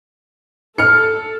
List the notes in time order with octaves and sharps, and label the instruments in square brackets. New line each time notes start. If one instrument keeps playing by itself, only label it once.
[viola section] A4 [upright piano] F6 C#7